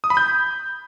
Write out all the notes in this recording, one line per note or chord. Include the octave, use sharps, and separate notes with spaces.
D#6
B5
G6